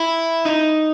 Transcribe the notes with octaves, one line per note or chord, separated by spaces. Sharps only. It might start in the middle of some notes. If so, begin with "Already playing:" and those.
Already playing: E4
D#4